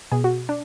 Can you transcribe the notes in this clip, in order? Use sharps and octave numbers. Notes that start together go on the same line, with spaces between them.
B2 G#4
F#4
D4